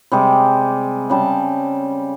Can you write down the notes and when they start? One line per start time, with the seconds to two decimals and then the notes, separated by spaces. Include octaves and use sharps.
0.12 C3 G3 G#3 D6
1.09 C#3 G3 A5